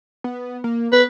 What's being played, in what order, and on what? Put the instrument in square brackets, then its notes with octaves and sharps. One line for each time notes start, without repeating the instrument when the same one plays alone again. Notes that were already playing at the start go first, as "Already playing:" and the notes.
[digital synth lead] B3
A#3
[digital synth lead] B3 [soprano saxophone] B4